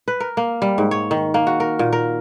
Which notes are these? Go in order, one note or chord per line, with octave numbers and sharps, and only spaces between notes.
B4
A#4
A#3
G3
G#2
C#5
D#3
A#3
F#4
A#4
A#2
A#4